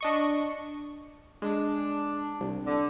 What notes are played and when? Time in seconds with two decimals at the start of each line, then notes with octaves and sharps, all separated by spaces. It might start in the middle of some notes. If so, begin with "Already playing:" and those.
0.01 D4 D#5 C#6
1.42 G#3 D4
2.40 C2
2.65 D3